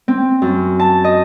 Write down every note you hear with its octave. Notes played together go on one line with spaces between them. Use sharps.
C4
F#2
A5
D#5